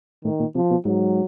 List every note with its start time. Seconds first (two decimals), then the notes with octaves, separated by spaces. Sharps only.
0.25 A2 D#3
0.40 A#2
0.55 C3 F3
0.71 B2
0.85 G#2 F#3